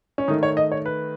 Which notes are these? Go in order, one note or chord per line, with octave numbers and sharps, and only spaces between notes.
C#4
D#3 A3 D#4
C#5
D#5
C#5
B4